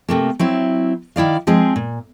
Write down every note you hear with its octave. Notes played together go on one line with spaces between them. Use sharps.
C3 A3 A#3
F#3 C4 E4
D#3 E4 D5 F5
F3 G#3 C4 G#4
A#2